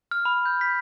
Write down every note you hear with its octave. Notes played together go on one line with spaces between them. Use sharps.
F6
B5
G6
B6